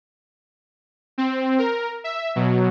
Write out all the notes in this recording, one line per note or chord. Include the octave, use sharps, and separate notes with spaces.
C4
A#4
E5
B2 F#3